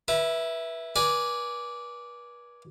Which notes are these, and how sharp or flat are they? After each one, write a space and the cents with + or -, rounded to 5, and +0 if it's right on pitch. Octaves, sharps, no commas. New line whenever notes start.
E4 +0 B4 -30
B4 -40 D5 -10 G#5 +0